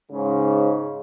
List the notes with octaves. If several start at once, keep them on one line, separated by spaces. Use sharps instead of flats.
G#2 C#3